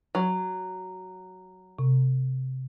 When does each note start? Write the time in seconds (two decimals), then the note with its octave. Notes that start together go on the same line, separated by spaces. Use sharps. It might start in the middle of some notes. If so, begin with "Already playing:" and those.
0.15 F#3
1.79 C3